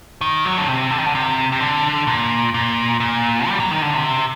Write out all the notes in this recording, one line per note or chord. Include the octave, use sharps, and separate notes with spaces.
D#3
F#3
D3
C3
D3
D#3
D3
C3
C3
D3
A#2
A#2
A#2
G3
F#3
D#3
D3
C3